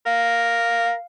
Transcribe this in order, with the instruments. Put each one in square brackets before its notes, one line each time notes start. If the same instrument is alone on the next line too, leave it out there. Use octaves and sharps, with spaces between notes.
[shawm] A#4 [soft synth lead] F5